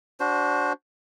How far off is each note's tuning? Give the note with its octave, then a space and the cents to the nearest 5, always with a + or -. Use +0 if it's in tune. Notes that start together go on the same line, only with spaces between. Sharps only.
D4 -20 F#4 +0 C5 +0